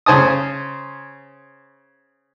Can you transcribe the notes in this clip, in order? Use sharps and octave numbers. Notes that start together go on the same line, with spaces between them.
C#3 C5 G#5 A5 D#6